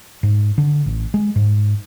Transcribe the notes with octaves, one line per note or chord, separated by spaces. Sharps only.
G#2
D3
A1
G#3
G#2